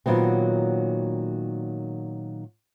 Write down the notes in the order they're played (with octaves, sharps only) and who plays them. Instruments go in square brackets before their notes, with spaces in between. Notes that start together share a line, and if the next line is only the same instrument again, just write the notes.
[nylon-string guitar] A#2 D#3 F#3 B3 C4